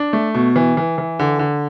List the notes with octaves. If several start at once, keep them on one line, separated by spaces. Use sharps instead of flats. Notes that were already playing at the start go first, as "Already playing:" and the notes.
Already playing: D4
A3
B2
E3
E3
E3
D3
D3